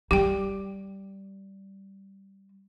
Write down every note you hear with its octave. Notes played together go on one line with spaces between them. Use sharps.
G3 G4 G5